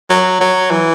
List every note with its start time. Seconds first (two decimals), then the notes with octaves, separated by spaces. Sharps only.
0.10 F#3
0.41 F#3
0.71 E3